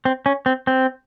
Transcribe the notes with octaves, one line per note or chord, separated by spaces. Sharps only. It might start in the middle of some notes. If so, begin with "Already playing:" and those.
C4
C#4
C4
C4